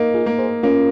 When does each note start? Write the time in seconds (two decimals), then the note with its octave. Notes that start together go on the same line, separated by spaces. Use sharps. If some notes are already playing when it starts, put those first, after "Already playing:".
Already playing: A#3 D#4
0.14 F4 G#4
0.26 A#3
0.39 G#4 C5
0.63 A#3 C#4 F4